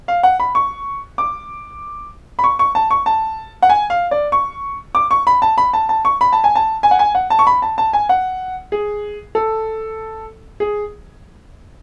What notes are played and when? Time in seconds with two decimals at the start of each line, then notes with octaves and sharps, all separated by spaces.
0.08 F5
0.23 F#5
0.40 B5
0.55 C#6
1.18 D6
2.39 B5
2.44 C#6
2.59 C#6
2.75 A5
2.91 C#6
3.06 A5
3.62 F#5
3.70 G#5
3.90 F5
4.11 D5
4.32 C#6
4.95 D6
5.11 C#6
5.27 B5
5.42 A5
5.58 B5
5.73 A5
5.89 A5
6.05 C#6
6.21 B5
6.33 A5
6.44 G#5
6.56 A5
6.83 G#5
6.91 F#5
6.99 G#5
7.15 F#5
7.30 A5
7.39 C#6
7.47 B5
7.62 A5
7.78 A5
7.93 G#5
8.09 F#5
8.72 G#4
9.35 A4
10.60 G#4